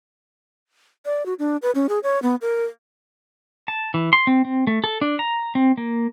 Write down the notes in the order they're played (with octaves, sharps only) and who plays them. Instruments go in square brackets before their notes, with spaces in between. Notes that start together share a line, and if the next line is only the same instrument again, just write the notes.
[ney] D5
F#4
D4
B4
C#4
G#4
C#5
B3
A#4
[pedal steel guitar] A5
E3
C6
C4
C4
A3
A4
D4
A#5
C4
A#3